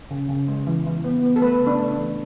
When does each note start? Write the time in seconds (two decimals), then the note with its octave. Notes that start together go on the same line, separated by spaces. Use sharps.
0.11 C#3
0.29 C#3
0.48 G#3
0.67 E3
0.86 E3
1.04 B3
1.23 B3
1.36 A4
1.42 A3 B4
1.61 C#3
1.67 D4
1.79 A3
1.92 D4
1.98 E3